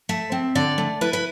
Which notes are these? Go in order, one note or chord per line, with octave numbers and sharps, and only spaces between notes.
A3 E5
C4
D3 D5
A3
E4 B4
B4